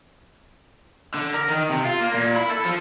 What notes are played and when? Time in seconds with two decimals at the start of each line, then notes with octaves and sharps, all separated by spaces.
1.14 D3
1.34 A#4
1.48 D#3
1.70 C3
1.85 F4
2.00 A#3
2.14 A#2
2.35 E4
2.51 A4
2.65 F3